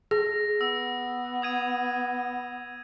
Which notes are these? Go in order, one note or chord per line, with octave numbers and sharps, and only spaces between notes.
G#4 A#6
B3 E6
D#6 G#6 D#7